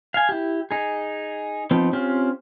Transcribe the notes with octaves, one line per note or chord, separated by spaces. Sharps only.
F5 G#5
E4 G4
D#4 G#4
F3 B3 C4 D#4
C4 C#4 F4 G4